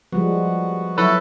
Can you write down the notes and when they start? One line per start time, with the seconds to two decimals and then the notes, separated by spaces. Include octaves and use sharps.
0.12 F3 G3 G#3 B3 F#4
0.98 F#3 E4 A4 B4 C#5